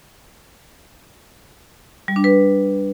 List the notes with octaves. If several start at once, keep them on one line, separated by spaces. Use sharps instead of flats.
G3
D4
B4